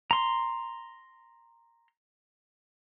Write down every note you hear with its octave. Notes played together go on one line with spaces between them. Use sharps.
A#5 C6